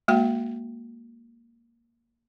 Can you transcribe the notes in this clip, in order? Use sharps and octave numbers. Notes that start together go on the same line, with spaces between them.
G#3 A#3 F#4 G5